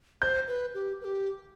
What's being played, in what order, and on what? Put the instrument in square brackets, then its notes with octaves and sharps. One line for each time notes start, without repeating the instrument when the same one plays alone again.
[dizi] C5 [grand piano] G6
[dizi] B4
G4
B4
G4